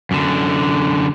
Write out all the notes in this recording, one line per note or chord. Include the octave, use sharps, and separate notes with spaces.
F#2 D3